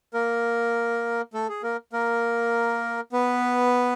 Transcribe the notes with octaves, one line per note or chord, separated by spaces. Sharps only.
A#3 A#4
A3 A4
G#4
A#3 A#4
A#3 A#4
B3 B4